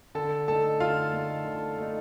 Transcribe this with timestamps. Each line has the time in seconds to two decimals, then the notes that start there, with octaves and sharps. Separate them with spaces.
0.15 D3 A4 A5
0.48 A3 D#4 A4 A5
0.80 D3 F4 F5
1.13 A3 D#4
1.45 D3
1.78 A3 D#4